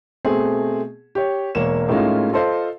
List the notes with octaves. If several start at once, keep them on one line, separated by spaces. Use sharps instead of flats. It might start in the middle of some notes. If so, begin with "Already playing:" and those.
B2 A3 C4 G#4
G4 C#5
E1 A#3 C#5 E7
A2 G#3 A#3 C#4 D#4 F4
F4 A4 C5 D#5 F5